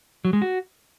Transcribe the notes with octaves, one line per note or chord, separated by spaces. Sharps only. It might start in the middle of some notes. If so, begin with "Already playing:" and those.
F#3
G#3
F#4